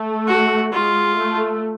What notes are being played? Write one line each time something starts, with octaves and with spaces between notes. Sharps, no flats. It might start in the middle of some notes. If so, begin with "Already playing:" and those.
Already playing: A3
F#4
G#3 F4
A3